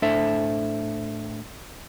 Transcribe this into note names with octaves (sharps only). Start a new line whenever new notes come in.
A2 D4 A4 C5 E5